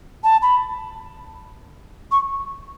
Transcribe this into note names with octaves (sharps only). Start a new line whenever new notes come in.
A5
B5
C#6